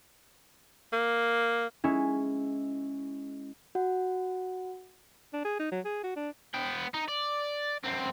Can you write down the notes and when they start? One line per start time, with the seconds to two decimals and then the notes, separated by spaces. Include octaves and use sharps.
0.93 A#3
1.84 G#3 C#4 E4
3.75 F#4 F#5
5.33 D4
5.45 G#4
5.60 D#4
5.72 F#3
5.85 G#4
6.04 F#4
6.16 D4
6.54 B3 G5
6.94 D#4
7.08 D5
7.84 F#2 C4